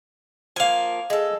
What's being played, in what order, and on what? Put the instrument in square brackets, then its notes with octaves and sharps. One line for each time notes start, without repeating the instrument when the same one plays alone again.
[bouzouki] F3 A#3 [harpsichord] F5 G#5
[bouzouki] G#3 A4